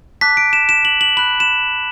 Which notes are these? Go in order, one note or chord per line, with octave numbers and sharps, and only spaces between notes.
A5 D6 F#6 B6
D7
E7
E7
F#7
F#7
B5 F#6 F#7
E7